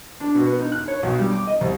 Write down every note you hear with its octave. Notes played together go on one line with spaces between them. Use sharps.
D4
B2
B3
D#4
F#6
C#5
B1
G3
D6
D#5
C2